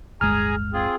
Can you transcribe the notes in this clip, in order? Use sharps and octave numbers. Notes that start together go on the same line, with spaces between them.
D1 G1 G#3 G#4 G#5 A#5 F6
C4 F4 G#4